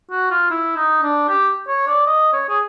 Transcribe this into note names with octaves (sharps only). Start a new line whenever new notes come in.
F#4
F4
E4
D#4
D4
G4
C#5
D5
D#5
C#5
G#4